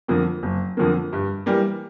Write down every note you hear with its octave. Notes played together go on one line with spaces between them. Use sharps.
F2 D3 F3 A#3
F#1
F2 D3 F3 A#3
G2
E3 G3 A#3